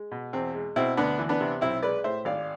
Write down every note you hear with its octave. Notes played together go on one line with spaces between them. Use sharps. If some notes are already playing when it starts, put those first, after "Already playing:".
Already playing: G#3
B2
E2 C4
G#3
B2 C4 E4
D2 B3 D4
E3
B3 D4
C3
B1 C4 E4
G#3 B4 D5
A2 C5 E5
G#1 D5 F5